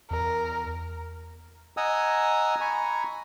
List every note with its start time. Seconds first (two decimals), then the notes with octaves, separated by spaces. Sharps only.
0.11 E2 A#4
1.77 D#5 F#5 G#5 A#5 D#6 E6
2.61 G#5 A#5 B5 C#6